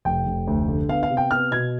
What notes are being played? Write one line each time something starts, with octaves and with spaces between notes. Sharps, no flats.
F1 G5
F1
D2
D3
B3 F5
F5
C3
G5
B3 F6
B2 G#6